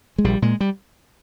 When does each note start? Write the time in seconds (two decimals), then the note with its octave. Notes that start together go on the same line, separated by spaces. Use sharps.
0.18 G#3
0.24 A#1 G3
0.42 A#2 G#3
0.61 G3